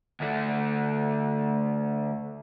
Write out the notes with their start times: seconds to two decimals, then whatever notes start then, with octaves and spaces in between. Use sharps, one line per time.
0.20 D2 A3